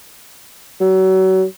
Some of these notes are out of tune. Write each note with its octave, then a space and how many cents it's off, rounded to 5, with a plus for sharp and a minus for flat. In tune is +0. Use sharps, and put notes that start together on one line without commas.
F#3 +30